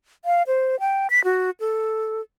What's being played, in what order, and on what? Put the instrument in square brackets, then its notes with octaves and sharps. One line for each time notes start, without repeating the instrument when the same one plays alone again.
[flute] F5
C5
G5
B6
F#4
A4